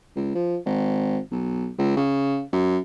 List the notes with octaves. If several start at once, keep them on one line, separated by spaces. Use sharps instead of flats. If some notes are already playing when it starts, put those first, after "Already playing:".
C#2
F3
G#1
B1
C#2
C#3
F#2